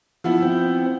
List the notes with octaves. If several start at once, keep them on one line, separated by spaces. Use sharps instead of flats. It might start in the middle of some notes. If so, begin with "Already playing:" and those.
F3 B3 E4
C4 G5